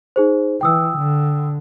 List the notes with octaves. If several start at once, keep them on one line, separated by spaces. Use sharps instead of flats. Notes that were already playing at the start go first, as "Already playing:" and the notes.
D#4 G#4 C5
E3 G5 D#6 E6
D3